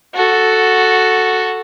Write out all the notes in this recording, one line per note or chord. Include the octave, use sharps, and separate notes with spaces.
F#4 A4